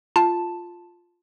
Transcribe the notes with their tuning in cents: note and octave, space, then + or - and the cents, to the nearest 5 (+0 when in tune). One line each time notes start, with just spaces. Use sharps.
F4 +0 A5 +0